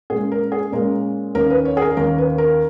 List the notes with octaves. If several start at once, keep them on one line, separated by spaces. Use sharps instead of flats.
A#2 G#3 C#4 G#4
A#4
G#4
A#2 G#3 C#4 A#4
D#2 D#3 A#3 C#4 A#4
B4
C#5
G#4
A#4
D#2 D#3 A#3 C#4 A#4
B4
A#4